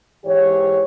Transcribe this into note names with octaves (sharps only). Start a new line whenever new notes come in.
G#2 E3 G4 C#5